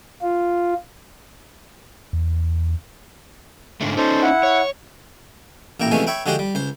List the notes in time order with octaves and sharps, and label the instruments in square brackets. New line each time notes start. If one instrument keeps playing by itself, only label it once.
[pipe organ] F4
[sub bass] E2
[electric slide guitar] G#2 D3 A3
[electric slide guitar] C#4 D#4 [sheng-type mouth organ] A4 C5
[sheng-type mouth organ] E4 F#5
[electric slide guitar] C#5
[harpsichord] A1 A#2 E4 G5 A#5
C3 E3 F3 G#3 A3 C#4
C#5 E5 G5 B5
D3 F3 G#3 F#4 G4 C5
G3
C#2 C5